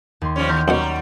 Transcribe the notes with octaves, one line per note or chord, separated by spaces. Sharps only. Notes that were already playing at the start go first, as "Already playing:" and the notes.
D#2 C6
F3 G3 C#4
D#2 C6 F6 G6
F#2 B2 F#3 G3 F#5